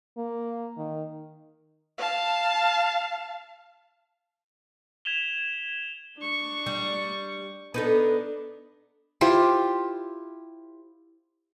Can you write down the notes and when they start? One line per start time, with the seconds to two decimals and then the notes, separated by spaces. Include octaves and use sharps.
0.17 A#3
0.77 D#3
1.98 F5 A5
5.05 G#6 B6 E7 F7 G7
6.17 D4 C#6
6.66 G3
7.74 B3 D4 D#4 A4
9.21 E4 F4 G4 C5